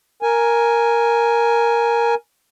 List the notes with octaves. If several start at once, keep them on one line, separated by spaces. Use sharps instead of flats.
A#4 G#5